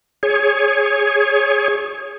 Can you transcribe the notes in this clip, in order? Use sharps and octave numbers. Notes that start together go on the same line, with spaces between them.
G#4 C#5